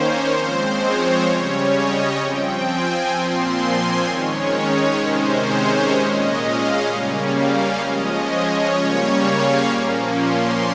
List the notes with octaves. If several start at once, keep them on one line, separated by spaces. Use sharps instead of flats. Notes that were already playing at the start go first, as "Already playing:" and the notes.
Already playing: D#3 A#3 C#4 C5 C#5
F3 G#3 C4 C5
C#5
C#3 G3 C#4 C#5
D#5
F3 C4 G5
G#5
A#2 F3 C4 C6
G#5
D#3 G#3 C#4 C#5
C#5
C3 D#3 G#3 C#4 C5
C#5
A#2 G#3 C#4 D#5
F5
C#3 G3 A#3 C#4
F5
F3 G#3 C#4 D#5
C#5
C#3 G3 A#3 C#4 C#5
F5
A#2 F3 A#3 C#4
C6